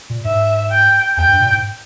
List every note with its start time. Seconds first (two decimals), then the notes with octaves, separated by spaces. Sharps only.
0.10 A#2
0.24 G#2 E5
0.70 G5
1.17 E2 G5
1.29 G2
1.40 A#2
1.52 G#2